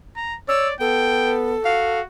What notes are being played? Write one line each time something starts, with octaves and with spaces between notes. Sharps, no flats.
A#5
C#5 D5 E6
B3 A4 G5
F#4 F5